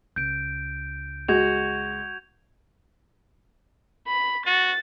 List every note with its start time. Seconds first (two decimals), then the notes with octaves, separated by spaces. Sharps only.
0.16 C#2 G6 D7
1.28 G#3 F#4 G6 G#6 F7
4.07 B5
4.46 F#4 A6